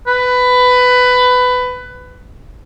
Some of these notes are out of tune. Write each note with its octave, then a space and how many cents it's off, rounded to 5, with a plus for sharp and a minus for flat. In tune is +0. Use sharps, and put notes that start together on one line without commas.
B4 +15